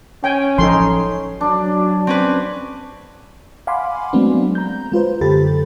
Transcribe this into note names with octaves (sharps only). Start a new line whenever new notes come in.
C#4 G5 G#5
A1 F3 F#3 D#4 A4 C6
F#3 D4
C4 C#4 B4
F5 F#5 G#5 B5 C6 D6
F#3 G#3 A3 B3 C4 D4
A#5 G6
G#3 F4 B4 C5
F#2 D3 G4 A4 B5 A6